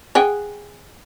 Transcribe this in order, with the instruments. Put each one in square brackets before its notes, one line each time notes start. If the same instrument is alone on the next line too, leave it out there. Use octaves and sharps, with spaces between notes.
[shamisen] G#4 F#5 G5